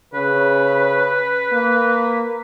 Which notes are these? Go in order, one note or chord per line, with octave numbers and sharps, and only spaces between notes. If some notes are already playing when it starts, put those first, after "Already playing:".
C#3 B4
A#3